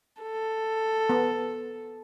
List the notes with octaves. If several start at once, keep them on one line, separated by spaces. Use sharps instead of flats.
A4
B3